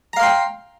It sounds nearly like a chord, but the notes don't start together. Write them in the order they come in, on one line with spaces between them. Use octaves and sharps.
A#5 F5 C6 G5